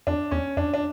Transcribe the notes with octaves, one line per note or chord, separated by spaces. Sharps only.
F2 D4
E2 C#4
F2 D4
D4